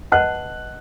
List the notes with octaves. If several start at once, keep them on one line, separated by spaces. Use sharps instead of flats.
B4 D#5 F#5 A5 F#6